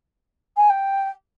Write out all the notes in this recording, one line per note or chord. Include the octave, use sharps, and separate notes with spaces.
G#5
G5